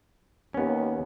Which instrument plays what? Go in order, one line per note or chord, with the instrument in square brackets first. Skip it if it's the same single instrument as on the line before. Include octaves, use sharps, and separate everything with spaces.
[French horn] D#2 [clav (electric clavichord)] B3 C#4